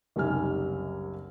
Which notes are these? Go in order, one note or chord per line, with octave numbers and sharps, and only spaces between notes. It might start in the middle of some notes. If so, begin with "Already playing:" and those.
F#1 C2 G3 D#4 G#5 F6